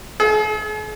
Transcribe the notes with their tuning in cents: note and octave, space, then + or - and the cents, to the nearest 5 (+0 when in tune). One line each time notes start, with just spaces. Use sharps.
G#4 +45